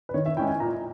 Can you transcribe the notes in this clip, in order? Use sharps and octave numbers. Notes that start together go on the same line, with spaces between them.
B4
D#3 C#5
E5
G#3 C#4 E4 G5
G#5
A#2 A#5